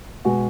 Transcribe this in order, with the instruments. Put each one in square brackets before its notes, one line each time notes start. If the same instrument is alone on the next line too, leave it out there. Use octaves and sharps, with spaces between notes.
[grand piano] B2 G#3 F#4